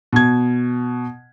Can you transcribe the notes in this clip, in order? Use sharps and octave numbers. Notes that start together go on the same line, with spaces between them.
B2 G#6